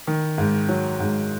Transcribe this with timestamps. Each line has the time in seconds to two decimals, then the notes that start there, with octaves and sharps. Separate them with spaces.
0.07 D#3
0.38 G#2
0.69 F#3
1.00 G#2